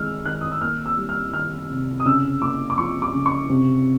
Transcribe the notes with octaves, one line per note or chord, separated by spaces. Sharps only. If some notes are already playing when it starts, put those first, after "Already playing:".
Already playing: D#3 G#3 E6 F6
D#3 F#6
D#6
E6
A#3 F6
E6
G3
F6
D#3 F6
C3
D#6
C#3 E6
A#3 D6
D6
F3 C#6
D6
C#3
C#6
C3